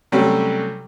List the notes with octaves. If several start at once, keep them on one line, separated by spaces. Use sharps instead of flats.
C3 F#3 G3 A3 C#4 G4